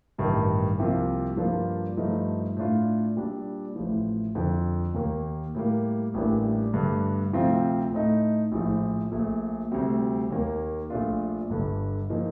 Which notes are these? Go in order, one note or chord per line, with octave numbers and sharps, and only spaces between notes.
A1 G2 D#3
C2 C3 F3 A#3 F4
G2 F3 A#3 D4 F4
G2 F3 A3 D#4
A2 A3 D4 F4
A#2 G3 D4
A1 A2 F3
F2 D3 F3
D#2 D#3 A#3
A2 G3 A#3
A1 A2 G3 A#3 D4
G2 D3 A3
D2 C3 F3 C4 F4
A2 A3 D#4
A#1 A2 F3
A#1 A#2 A3
D2 C3 G3 C4
D#2 D#3 A#3
A#1 A#2 A3 D4 F4
G1 G2 D3
A#2 F3 A#3 D#4